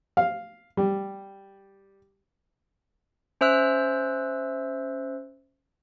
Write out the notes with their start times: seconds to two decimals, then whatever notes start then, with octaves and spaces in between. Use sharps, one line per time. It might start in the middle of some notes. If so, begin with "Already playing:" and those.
0.17 F5
0.77 G3
3.41 C#4 C5 E5 E6 F#6